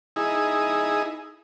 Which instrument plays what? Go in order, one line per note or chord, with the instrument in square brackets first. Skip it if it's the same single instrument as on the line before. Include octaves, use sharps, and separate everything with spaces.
[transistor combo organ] D#4 E4 G#4